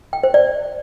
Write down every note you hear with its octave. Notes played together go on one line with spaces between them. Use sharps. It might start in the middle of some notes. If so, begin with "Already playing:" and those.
G5
C5
D5